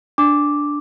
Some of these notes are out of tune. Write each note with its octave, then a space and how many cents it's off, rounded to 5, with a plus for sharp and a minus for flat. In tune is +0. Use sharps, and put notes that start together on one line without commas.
D4 +0 D6 +0